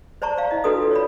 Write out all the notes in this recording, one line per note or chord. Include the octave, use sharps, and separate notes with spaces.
C5 D5 A5 A#5 C#6
D5 F5
E4 D#5
D4 F#4 A4 B4 D#6
F4
C#5 D5 B5